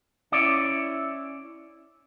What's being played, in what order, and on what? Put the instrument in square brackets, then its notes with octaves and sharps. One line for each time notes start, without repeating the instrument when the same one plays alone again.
[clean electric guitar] C#4 E4 D5